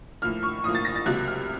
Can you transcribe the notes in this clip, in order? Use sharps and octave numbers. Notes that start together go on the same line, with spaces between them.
A2 F3 A#3 F6
C#6
A2 F3 A#3 D#6
A6
A#6
A6
C#2 C3 F#3 A#3 F#6
F6